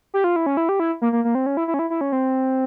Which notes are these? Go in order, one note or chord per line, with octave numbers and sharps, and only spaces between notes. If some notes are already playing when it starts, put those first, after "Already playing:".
G4
F4
E4
C#4
E4
G4
E4
A#3
A#3
A#3
C4
C#4
E4
E4
C#4
E4
E4
C#4
C4